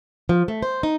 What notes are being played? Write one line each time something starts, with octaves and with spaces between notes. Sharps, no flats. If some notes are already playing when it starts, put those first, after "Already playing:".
F3
A3
C5
D#4